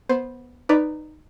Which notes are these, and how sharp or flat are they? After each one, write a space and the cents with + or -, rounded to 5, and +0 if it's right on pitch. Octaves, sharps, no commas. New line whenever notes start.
B3 -10 C5 +0
D#4 -15 B4 +0 D5 +0